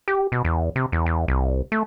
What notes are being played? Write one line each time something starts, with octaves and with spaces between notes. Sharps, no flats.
G4
B2
E2
C3
E2
E2
C2
A3